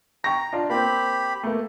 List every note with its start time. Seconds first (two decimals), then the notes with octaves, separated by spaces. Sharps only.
0.24 G5 A#5 C#6 A#6
0.53 D4 F4 D5
0.70 A#3 C4 G4 B5
1.43 A3 A#3